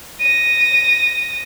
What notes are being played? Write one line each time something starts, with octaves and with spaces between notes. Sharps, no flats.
A#6 D#7